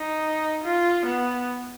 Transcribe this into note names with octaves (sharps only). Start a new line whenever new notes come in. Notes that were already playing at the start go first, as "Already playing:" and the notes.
Already playing: D#4
F4
B3